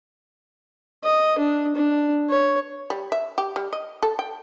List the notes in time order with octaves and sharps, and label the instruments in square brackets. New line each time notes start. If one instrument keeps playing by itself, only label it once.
[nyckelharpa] D#5
D4
D4
C#5
[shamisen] G3
E5
G4
G3
D#5
A4
G5